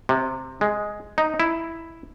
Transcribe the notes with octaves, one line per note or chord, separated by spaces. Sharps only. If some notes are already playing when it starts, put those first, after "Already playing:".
C3
G#3
D#4
E4